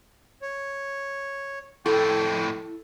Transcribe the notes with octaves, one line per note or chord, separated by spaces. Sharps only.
C#5
F2 A2 E4 A4 G5